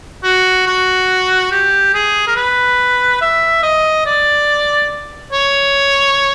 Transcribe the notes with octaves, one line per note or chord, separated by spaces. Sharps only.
F#4
F#4
G4
G#4
A#4
B4
E5
D#5
D5
C#5